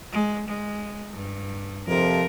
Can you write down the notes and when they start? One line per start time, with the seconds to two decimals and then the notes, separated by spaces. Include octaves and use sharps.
0.12 G#3
0.48 G#3
1.13 G2
1.88 F2 C3 F3 A#4